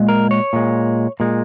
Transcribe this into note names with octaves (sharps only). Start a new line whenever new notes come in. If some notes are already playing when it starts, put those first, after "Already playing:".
Already playing: A#2 G#3
A#4
C#5
A#2 G#3
A#2 G#3